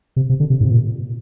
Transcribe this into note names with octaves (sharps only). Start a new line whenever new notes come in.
C3
C3
D3
C3
G#2
C3
A#2